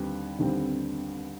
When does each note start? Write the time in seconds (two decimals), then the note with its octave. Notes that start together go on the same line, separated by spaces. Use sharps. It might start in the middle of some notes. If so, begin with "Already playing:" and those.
Already playing: D#2 D3 G3 C4 B4
0.39 D#2 D3 G3 C4